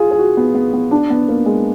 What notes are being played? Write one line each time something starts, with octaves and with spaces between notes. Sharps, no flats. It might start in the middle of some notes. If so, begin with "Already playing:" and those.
Already playing: F4 G#4
G#4
F#4
B3
B3
B3
D4
B3
A#3
G#3